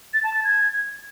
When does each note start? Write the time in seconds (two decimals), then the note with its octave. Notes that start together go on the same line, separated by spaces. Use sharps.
0.14 A6
0.24 A5
0.34 A6
0.44 G#6